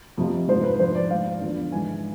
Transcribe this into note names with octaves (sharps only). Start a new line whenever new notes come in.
F2 C3 F3
G#2 F3 C5
B4
G#2 F3 C5
D5
G#2 F3 F5
E2 D3 F3
G#2 E3 G#5